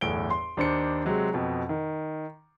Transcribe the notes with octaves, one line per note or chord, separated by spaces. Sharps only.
G1 E2 A2 D7 G7
C6
D#2 D4 C5 C#7
C3 F#3 G#3 C4
F2 B2
D#3